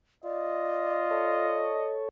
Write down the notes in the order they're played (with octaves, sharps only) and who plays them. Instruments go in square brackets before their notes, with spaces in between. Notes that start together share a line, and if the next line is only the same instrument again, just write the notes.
[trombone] F4 [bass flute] D5 [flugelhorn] D#5
[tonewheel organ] A4 C#5